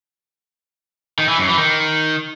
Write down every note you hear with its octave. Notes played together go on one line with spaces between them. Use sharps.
D#3
E3
F#2
E3
D#3